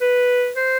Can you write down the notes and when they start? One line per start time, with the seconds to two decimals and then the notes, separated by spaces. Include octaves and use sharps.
0.01 B4
0.56 C5